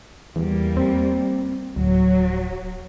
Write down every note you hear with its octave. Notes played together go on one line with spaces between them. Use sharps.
E2 G3 A#3
C4
D1 F#3